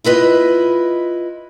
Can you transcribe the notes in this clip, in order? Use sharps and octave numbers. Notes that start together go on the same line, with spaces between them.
E4 F4 B4 D#5